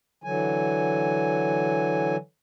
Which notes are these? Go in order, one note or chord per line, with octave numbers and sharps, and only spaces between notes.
D3 E3 F#3 G#5